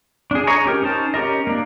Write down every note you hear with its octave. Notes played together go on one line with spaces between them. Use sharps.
D4 G#4
G#4 C#5 D#5 A#5 C#6
C#4 G4 A#4
C#4 D#4 C5 A5
C#4 G4 A#4 D#5
A#3 D4